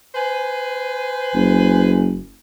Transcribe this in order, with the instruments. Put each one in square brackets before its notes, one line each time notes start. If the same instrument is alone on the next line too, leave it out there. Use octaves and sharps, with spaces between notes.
[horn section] B4 C5 G#5
[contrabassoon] F#1